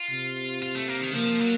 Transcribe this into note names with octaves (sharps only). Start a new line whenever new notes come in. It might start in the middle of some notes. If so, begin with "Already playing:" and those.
Already playing: F4
C3
F4
A3
A#3
D#3
F3 A#3
F#3